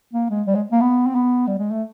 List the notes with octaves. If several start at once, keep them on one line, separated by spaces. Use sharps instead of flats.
A#3
G#3
G3
G#3
A#3
B3
C4
B3
G3
G#3
A3